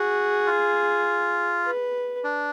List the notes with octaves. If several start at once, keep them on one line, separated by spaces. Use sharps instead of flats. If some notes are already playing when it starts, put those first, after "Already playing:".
Already playing: F#4 G#4
F4
B4
D4